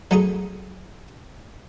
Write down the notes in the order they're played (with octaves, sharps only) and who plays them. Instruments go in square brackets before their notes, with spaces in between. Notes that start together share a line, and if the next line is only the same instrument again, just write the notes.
[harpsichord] F#3 A3 C#4 G#4